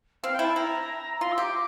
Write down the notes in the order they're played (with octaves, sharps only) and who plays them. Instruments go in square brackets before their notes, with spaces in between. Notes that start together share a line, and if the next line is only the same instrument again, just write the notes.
[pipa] C4 [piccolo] F5
[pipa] E4 [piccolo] G5
[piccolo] A5
[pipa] E4 [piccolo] A#5
[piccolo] A#5
[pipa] F4 [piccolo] C6
[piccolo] E6
[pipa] G4
[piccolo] D6